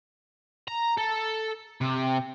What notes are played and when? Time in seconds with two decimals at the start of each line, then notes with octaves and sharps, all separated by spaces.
0.68 A#5
0.97 A4
1.81 C3